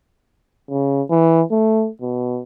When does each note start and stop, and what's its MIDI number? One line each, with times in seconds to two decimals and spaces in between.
0.70 1.02 49
1.10 1.42 52
1.51 1.89 57
2.01 2.42 47